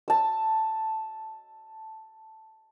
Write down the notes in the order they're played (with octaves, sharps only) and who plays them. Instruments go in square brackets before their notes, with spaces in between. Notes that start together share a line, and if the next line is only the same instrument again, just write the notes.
[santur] A5 E6